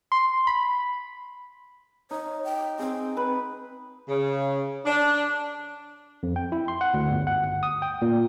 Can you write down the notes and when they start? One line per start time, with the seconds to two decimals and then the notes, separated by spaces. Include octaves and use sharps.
0.12 C6
0.47 B5
2.11 D#4 C#5
2.44 G5
2.79 C4 G#4 G5
3.17 B4 B5
4.08 C#3
4.85 D4
6.23 F2
6.36 G5
6.52 E4
6.68 C6
6.81 F#5
6.94 D2
7.11 G1
7.27 F#5
7.45 G1
7.63 D#6
7.82 G5
8.02 A#2